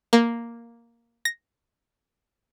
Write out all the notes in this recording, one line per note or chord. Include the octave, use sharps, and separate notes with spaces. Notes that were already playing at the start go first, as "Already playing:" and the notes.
A#3
A#6